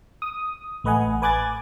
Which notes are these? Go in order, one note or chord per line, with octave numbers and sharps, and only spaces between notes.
D#6
A1 A3 B4 D#5 F#5 G#5
B4 G#5 D6 F#6 G#6 A6